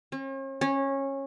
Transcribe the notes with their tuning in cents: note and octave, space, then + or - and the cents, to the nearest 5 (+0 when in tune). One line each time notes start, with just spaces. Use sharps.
C#4 -45
C#4 -20